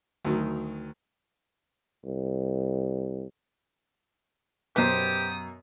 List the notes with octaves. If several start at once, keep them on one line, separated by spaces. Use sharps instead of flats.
D2 D#3 F#3
C2
F#2 B2 G4 B4 C5 D#6